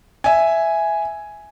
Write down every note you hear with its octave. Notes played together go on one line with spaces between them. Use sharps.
E5 G#5